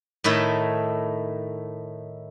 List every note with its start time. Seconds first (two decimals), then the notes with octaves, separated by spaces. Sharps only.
0.24 A2 D#3 A3 E4